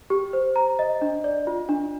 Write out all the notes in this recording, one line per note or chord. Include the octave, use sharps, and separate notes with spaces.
G4
C5
A#5
D#5
D4
D5
F4
D4